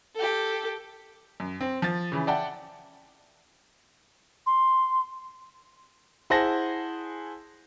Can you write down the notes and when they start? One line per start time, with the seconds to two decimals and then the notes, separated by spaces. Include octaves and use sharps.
0.15 G4 A4
1.40 F#2
1.61 C4
1.82 F3 A6
2.12 C#3 E3
2.27 D5 E5 F#5 G5 A5
4.46 C6
6.30 E4 G#4 C5 F#5 A5 A#6